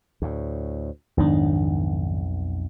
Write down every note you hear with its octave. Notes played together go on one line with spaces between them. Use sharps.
D2 A2
B1 F2 G#2 D#3 B3 D4